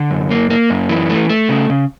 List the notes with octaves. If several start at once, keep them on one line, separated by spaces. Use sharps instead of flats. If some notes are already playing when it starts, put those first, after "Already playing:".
Already playing: D3
F#2
A#3
A#3
F#2
E3
A3
A3
C#3
C#3